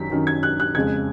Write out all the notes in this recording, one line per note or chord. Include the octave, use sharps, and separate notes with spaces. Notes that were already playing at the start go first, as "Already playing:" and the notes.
Already playing: F#2 D#3 F#3 B6
F#2 D#3 F#3
G#6
F#6
F#6
F2 C#3 G#3 G#6